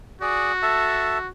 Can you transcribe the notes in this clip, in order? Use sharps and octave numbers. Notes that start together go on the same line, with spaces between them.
F#4 G#4 D5
A4 E5 A5